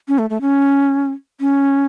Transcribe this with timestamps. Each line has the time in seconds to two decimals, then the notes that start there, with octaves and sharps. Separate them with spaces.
0.08 C#4
0.18 A3
0.30 A3
0.41 C#4
1.40 C#4